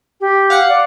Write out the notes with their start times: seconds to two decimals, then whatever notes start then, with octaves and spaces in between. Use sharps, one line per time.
0.21 G4
0.50 F5 F#5 C#7
0.68 D5